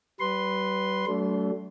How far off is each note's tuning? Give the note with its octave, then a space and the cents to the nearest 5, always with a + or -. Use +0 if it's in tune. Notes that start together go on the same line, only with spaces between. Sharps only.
G3 -40 B4 +0 C6 +0
F#3 +35 A3 +0 D4 -35